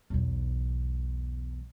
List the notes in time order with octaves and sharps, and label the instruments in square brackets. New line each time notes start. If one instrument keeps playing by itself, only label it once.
[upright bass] B1 E2